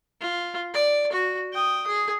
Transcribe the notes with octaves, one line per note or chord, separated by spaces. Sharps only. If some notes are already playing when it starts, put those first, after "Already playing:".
F4
D5
F#4
G5 D#6
G#4